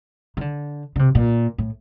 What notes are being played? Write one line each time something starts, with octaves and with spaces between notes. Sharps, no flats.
D#3
D3
D3
C3
A#2
A2